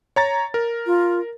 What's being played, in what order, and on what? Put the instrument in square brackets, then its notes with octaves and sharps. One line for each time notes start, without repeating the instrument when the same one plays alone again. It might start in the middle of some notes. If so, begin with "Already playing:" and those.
[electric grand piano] C#5 A#5 A6
A#4
[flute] F4